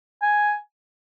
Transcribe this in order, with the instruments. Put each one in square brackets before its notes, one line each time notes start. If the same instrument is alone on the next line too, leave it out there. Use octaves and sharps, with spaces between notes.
[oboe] G#5